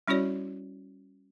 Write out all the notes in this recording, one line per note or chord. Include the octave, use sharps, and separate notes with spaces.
G3 C#4 E4 F#4 C#5 D5